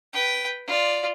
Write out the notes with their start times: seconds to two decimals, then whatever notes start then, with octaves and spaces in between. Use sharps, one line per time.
0.13 B4 G5
0.67 F4 D5